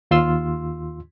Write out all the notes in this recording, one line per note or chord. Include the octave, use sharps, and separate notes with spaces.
D#2 F4 C6 E6